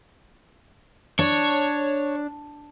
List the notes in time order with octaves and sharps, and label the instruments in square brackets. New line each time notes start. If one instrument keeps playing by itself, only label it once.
[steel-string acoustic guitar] D4 [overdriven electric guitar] C#5